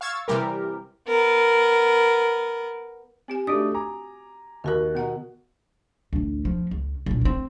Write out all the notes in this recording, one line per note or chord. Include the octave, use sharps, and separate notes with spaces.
F5 C#6 E6 G#6 A6
C3 E3 G3 G4 A#4
B3 A#4
C4 G4 G#5
A3 D4 F#4 G4 D#5 D#6
G#5 A#5 D6
D#2 D#3 F#4 A#4 F#6
B2 B3 F#5 A#5
A1 D2
F3
C#2
E1 A#2
A#3 C4